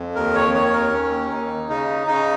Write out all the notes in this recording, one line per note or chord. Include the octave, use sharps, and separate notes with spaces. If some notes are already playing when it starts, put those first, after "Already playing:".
Already playing: F2
D#2 A#4
C#5
D#3 C#5
A#4
D#2 C#4
D#2 D#4
C#3 D#4
C#3 D#4